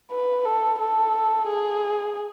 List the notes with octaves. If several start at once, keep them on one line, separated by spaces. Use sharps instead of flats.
B4
A4
A4
G#4